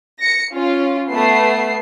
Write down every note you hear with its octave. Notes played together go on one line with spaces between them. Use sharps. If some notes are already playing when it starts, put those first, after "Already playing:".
A#6 C#7
C#4 F4
A3 B3 C7